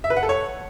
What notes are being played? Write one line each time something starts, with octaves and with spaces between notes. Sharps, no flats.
E5
B4
F#5
A4
C#5